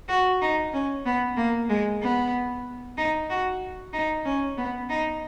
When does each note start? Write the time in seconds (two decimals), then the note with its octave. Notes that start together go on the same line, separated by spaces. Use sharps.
0.09 F#4
0.41 D#4
0.73 C#4
1.06 B3
1.37 A#3
1.69 G#3
2.02 B3
2.98 D#4
3.30 F#4
3.93 D#4
4.25 C#4
4.57 B3
4.89 D#4